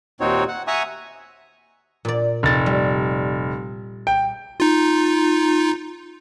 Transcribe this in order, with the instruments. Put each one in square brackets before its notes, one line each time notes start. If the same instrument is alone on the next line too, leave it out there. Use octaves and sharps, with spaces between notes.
[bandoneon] D#2 A#2 C4 D#4 F#4 C#5
F#5
E5 F#5 G#5 A#5 C#6 D#6
[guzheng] A#2 D5
[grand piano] F1 A6
[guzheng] G3
[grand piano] G5
[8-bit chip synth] D#4 F4